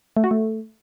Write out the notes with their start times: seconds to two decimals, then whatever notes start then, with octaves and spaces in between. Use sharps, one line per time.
0.17 A3
0.24 F#4
0.31 A3